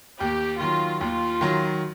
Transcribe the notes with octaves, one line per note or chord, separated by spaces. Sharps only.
D#2 G4
D#3 F#3 F4
D#2 F4
D#3 F#3